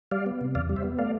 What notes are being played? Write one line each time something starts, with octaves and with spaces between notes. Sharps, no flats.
G3 D5 F5
B3
C3
E2 D5 F5
G3
C5 E5
B3
A3 D5 F5